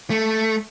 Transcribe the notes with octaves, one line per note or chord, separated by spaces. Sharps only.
A3